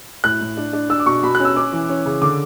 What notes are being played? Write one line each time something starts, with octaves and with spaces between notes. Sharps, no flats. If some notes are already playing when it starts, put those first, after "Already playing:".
A2 F#6
A2
D4
D4
D4 E6
D6
B2 C#6
B2 B5
F#6
C#4 E6
C#4 D6
E3
C#4
C#3
D3 D6